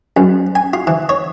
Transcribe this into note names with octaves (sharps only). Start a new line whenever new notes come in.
F#2
G#5
F4
E3
C#5